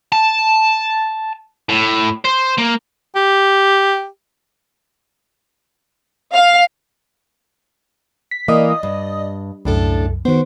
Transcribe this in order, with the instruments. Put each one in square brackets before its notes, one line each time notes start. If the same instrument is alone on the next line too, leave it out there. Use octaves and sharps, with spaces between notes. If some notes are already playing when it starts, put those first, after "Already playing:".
[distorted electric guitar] A5
A2
C5
A#3
[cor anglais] G4
[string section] F5
[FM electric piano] B6
[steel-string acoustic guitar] E3 A#3 [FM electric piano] D5 D#5 D#6
[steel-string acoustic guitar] G2
[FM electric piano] C2 F#2 [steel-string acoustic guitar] A2 D4 A4
[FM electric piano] D#3 B3 [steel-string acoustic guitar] F#4 C5